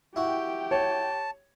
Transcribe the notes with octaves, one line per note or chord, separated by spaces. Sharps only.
E4 F#4 G4 G5
C#5 A5